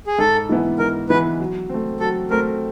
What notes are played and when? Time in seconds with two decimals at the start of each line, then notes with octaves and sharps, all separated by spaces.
0.07 G#4
0.19 G#2 A4
0.49 E3 G#3 B3 E4
0.79 G#2 A#4
1.09 E3 G#3 B3 E4 B4
1.40 F#3
1.69 A3 C4
2.00 F#3 A4
2.31 A3 C4 A#4